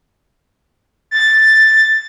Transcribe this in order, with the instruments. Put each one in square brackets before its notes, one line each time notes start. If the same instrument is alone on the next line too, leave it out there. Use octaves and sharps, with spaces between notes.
[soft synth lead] A6